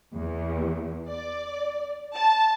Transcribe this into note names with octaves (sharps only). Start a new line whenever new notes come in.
E2
D5
A5